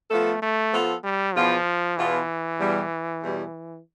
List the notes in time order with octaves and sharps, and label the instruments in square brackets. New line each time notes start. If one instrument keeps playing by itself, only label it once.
[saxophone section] F3 B3 F4 A4 [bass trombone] A3
[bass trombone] A3
[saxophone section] F3 B3 F4 A4
[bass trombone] G3
[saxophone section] E2 B2 B3 F4 [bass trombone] F3
[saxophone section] E2 B2 B3 F4 [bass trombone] E3
[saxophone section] E2 B2 G3
E2 B2 G3